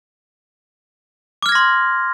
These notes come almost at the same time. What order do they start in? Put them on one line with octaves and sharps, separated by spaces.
D6 F6 G#6 A#6 C6